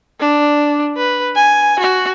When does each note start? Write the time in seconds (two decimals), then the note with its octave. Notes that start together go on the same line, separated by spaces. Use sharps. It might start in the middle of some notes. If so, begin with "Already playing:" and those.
0.20 D4
0.97 B4
1.36 G#5
1.80 F#4